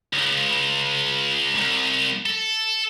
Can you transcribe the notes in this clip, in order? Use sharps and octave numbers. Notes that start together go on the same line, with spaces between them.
C#2
C2
A4